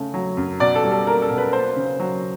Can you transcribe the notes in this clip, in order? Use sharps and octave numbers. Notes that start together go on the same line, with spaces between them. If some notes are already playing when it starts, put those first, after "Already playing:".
Already playing: C#3 A3
F#3
F#2
B2 D5
A4
G3
A4
A#3 A#4
A4
B2
B4
A#3 C5
C#3
F#3